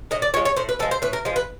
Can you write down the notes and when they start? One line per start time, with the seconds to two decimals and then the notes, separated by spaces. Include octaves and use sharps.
0.11 A2 D#5
0.22 D5
0.34 F3 G#3 C#5
0.45 C#5
0.57 A2 C5
0.69 B4
0.79 F3 G#3 A4
0.91 C5
1.02 A2 B4
1.13 A#4
1.25 F3 G#3
1.36 B4